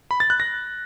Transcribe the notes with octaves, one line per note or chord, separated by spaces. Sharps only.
B5
A6
F#6
A#6